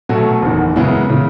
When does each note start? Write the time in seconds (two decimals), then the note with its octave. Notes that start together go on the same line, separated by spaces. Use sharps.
0.09 B2 F#3 A3 C#4
0.42 F#1 E2 D#3
0.76 F#2 C#3 G#3 B3 E4
1.09 C#3 E3